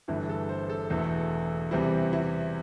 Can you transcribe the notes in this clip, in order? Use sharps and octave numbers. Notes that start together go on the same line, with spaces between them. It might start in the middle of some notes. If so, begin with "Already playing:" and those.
G1 G2 E3 A3 E4
A4
C5
A4
E1 E2 E3 A3
E2 C3 E3 G3 C4 E4
E4